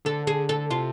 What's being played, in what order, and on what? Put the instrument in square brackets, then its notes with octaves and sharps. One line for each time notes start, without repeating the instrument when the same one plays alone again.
[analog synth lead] D3 [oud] A4
[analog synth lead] D3 [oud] G#4
[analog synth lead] D3 [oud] A4
[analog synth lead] C3 [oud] F4